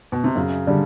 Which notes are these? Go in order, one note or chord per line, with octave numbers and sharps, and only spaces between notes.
B2
C3
F#2 C#3
D3 G3